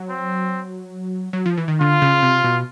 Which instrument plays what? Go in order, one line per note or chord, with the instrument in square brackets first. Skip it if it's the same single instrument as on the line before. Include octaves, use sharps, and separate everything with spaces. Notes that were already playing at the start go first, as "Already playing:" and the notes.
Already playing: [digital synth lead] F#3
[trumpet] C4
[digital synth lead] F#3
F3
E3
D#3
[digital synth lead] D3 [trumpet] F4
[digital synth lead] C#3
C3
B2